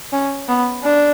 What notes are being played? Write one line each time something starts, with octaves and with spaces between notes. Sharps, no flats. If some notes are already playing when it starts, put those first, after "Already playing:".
C#4
B3
D4